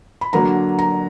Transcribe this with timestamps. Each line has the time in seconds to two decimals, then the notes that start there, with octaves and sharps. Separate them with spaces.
0.21 B5
0.33 D3 F#3 A#3 D4 A#5
0.79 A#5